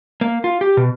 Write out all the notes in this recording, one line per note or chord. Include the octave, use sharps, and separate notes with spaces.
A#3
F4
G4
B2